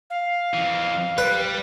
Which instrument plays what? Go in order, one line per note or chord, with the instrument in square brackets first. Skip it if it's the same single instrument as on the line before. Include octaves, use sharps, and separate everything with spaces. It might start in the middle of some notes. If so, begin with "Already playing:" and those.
[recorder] F5
[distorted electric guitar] F2 E3
[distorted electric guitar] G3 [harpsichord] B4